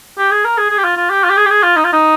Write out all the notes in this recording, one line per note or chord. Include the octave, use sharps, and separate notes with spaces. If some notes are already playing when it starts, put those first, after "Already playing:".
G4
G#4
A#4
G#4
G#4
G4
F4
F4
G4
F4
G4
G#4
G4
G#4
F4
D#4
F4
D#4